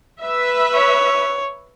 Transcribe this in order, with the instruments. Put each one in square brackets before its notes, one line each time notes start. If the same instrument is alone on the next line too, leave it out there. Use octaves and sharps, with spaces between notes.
[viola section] B4 E5
[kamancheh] C#5